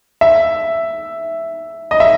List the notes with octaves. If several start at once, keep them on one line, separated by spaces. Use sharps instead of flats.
E5
D#5
E5